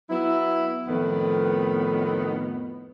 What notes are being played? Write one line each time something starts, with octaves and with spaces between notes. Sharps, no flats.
F#3 B3 E4
F2 A2 D#3 B3